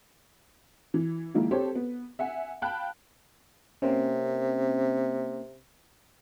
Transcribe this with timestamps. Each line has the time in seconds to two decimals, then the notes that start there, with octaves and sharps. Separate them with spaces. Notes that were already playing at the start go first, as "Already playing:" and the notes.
0.94 E3
1.34 D#3 F3 G#3 A#3 E4
1.51 C4 G4 A4 C5 C#5
1.75 B3
2.19 E5 F#5 G#5
2.62 F5 G5 A5 B5 F#6
3.82 C3 A#3 C4 C#4